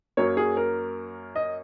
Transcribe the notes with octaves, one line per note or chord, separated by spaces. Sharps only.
F#2 F#3 A#3 C#5
G#4
A#4
D#5